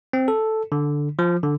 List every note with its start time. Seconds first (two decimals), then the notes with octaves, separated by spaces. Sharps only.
0.13 C4
0.28 A4
0.72 D3
1.19 F3
1.43 D3